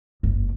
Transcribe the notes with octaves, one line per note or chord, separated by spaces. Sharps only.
F#1